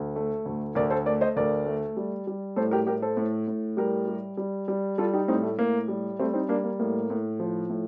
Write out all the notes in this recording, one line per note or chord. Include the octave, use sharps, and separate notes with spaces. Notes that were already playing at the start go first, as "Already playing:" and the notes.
Already playing: D2
A3
D2
D2 A#4 D5
A4 C5
A3 A#4 D5
C5 D#5
D2 A#4 D5
A3
G3
G3
A2 A4 C5
G4 A#4
A2 G4 A#4
A4 C5
A2
A2
G3 G4 A#4
G3
G3
G3
G3 F4 A4
D#4 G4
A2 C4 D#4
A3
A2 A#3
G3
G3 A3 C4
C4 D#4
G3 A#3 D4
A#3
A2 A#3
A2
F3
A2